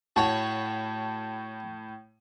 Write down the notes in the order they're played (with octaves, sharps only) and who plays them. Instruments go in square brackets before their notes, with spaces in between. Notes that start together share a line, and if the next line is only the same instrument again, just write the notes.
[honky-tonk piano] A2 [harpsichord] F#4 C#5 [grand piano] A5